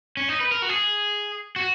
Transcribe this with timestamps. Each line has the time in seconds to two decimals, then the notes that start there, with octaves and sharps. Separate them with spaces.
0.17 C#4
0.29 D#4
0.40 B4
0.52 A#4
0.62 F#4
0.69 G#4
1.56 F#4